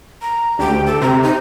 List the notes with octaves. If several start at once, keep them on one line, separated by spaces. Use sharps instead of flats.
A#5
D2 G4
A4
C3 A#5
D#4